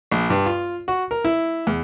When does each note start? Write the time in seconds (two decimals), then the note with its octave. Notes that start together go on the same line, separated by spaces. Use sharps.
0.12 A#1
0.30 G2
0.46 F4
0.88 F#4
1.11 A#4
1.25 E4
1.67 E2